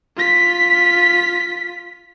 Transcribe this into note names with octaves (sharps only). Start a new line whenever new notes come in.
F4 B6